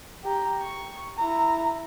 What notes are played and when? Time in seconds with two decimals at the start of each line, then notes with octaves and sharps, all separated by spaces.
0.24 G4 A#5
0.62 C#6
1.18 E4 A#5